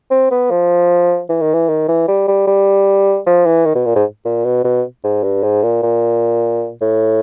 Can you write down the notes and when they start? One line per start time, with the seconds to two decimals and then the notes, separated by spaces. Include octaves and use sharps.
0.11 C4
0.31 B3
0.51 F3
1.29 E3
1.41 D#3
1.54 E3
1.69 D#3
1.88 E3
2.08 G3
2.28 G3
2.47 G3
3.27 F3
3.46 E3
3.66 D#3
3.75 B2
3.86 A#2
3.96 G#2
4.25 A#2
4.45 B2
4.65 B2
5.04 G#2
5.24 G2
5.43 G#2
5.63 A#2
5.83 A#2
6.81 A2